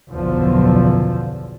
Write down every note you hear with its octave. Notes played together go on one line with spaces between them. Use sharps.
F#1 B1 E2 D3 F3